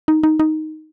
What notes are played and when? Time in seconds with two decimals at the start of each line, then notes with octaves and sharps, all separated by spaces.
0.08 D#4
0.23 D#4
0.40 D#4